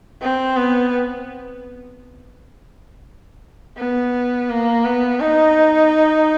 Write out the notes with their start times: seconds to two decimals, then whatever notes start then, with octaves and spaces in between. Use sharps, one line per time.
0.22 C4
0.57 B3
3.77 B3
4.49 A#3
4.85 B3
5.21 D#4